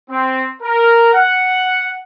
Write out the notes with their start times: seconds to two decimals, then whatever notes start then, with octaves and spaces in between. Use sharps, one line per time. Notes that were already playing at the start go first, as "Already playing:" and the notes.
0.10 C4
0.61 A#4
1.14 F#5